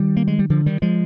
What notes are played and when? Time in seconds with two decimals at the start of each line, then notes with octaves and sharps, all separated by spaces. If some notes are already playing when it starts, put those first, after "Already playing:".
Already playing: D#3 G3
0.17 A#3
0.27 G#3
0.39 G3
0.50 D3 F3
0.66 D#3 G3
0.82 F3 G#3